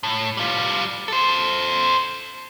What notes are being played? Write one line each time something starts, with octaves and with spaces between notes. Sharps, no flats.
A2
G3 F4
A4 C5